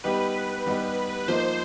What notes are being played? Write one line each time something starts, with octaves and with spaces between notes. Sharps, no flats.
G3 B3 D#4 G4 B4
G3 B3 D#4 G4
F3 A#3 D#4 C5